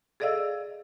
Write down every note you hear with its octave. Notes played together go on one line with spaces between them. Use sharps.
G#4 A4 D5 D#5 F5 E6